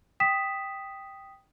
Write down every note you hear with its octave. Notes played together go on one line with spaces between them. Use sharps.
G5 D#6 B6 E7